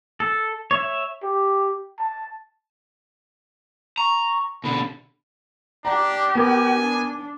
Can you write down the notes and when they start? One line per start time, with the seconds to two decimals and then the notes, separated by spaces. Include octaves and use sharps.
0.20 A4
0.71 C#5 E5
1.23 G4
1.99 A5
3.98 A#5 C#6
4.64 B2 D3 B5
5.85 D4 G4 A#5
6.35 B3 A#4 G#5
6.79 D4